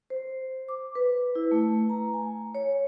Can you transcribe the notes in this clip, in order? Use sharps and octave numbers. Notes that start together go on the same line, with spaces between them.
C5
D6
B4
E4
A3
A#5
G#5
C#5